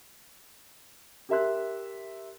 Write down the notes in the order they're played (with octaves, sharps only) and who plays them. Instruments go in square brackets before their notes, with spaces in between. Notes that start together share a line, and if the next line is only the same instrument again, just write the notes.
[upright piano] G4 A#4 E5 C6 F#6